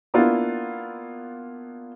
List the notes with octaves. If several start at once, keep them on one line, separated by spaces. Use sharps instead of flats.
A#3 B3 D4 E4 F4